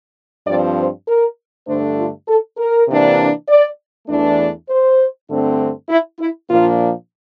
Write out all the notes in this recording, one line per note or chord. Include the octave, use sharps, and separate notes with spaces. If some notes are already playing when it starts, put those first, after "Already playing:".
G2 F3 C4 D5
C5
A#4
G2 D3 A3 D4 C5
F4
A4
A#4
C3 E3 A#3 D4
D5
E2 E3 A3 D4
C5
G2 D3 A3 C4
E4
E4
A#2 F3 A#3 D4 F4